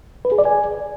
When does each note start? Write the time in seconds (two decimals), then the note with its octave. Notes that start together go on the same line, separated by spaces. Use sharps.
0.25 B4
0.32 G#4
0.39 D5
0.45 G#5